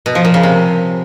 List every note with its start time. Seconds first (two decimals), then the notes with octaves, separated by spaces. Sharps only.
0.06 B2
0.15 F3
0.25 A#2
0.34 C#3
0.43 C3